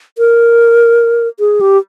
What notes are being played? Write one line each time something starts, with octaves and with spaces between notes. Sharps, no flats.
A#4
G#4
G4